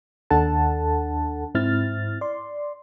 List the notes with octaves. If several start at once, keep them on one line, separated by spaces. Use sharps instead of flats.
D#2 D4 A4 F#5 A5
G#2 C4 E4 F6 A6
D5 C6